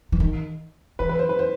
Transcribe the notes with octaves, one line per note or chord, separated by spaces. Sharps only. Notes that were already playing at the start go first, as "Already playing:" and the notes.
E3
D#3
E3 B4
B4
C5
B4
C5